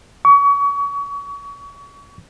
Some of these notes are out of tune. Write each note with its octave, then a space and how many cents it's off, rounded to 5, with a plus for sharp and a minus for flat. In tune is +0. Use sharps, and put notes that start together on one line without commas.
C#6 +35